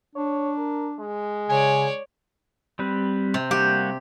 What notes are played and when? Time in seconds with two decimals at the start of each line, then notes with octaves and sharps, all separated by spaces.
0.15 D4 C#5
0.58 A#4
0.99 G#3
1.49 C#3 C#5 D5 G#5
2.79 G3 C4 B4
3.34 C3
3.51 G3 A#3 F#4 G4